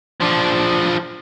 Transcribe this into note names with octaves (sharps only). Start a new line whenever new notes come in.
F3 D4